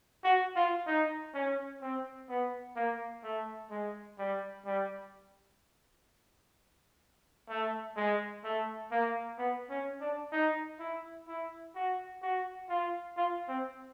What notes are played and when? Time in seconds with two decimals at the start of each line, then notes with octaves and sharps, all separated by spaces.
0.24 F#4
0.56 F4
0.87 D#4
1.34 C#4
1.81 C4
2.29 B3
2.76 A#3
3.23 A3
3.71 G#3
4.18 G3
4.65 G3
7.49 A3
7.97 G#3
8.44 A3
8.91 A#3
9.38 B3
9.70 C#4
10.01 D4
10.32 D#4
10.80 E4
11.28 E4
11.75 F#4
12.22 F#4
12.69 F4
13.17 F4
13.48 C4